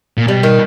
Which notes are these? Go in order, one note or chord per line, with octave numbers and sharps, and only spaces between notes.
A#2
B2 G3
D#3